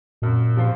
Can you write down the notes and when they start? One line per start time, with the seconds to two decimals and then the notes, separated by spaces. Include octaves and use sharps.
0.22 F#2 A#2
0.56 F3 C4 F4 C5